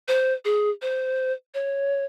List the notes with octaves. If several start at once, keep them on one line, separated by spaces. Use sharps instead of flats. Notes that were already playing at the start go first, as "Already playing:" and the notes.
C5
G#4
C5
C#5